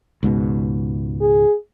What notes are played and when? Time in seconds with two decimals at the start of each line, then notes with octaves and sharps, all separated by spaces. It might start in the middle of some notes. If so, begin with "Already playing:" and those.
0.23 C#2 G#2 B2
1.21 G#4